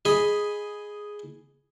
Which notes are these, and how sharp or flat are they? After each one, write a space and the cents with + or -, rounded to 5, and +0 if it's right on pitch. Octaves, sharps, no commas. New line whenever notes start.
G#4 +0 D#5 +0 B5 +0